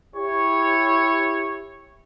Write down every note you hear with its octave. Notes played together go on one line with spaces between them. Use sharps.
E4 G4 C#5